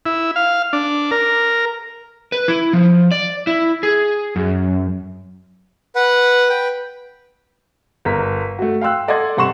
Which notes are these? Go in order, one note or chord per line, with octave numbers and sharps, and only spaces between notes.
E4
F5
D4
A#4
B4
E4
F3
D5
E4
G#4
F#2
B4 F#5
B4 G5
G1 A#4 B6
A3 F#4
F5 G5 C6 E6 F#6
A4 D5 D#5 F#5 C6 G#6
G2 C3 F#5 C6 C#6 E7